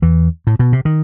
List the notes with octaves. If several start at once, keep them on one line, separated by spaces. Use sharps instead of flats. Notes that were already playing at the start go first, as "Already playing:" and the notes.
E2 E3
A2
B2
C3
D#3